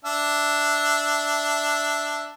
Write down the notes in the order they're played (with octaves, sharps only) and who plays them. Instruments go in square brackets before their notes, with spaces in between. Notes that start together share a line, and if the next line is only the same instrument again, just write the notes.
[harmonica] D4 E5